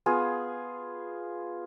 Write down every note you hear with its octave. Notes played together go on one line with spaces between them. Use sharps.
B3 F4 G#4 G#5